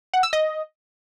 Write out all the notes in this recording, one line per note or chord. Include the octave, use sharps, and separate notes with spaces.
F#5
E6
D#5